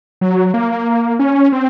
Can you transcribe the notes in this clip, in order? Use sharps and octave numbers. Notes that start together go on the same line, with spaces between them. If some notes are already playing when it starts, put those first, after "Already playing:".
F#3
A#3
C#4
C4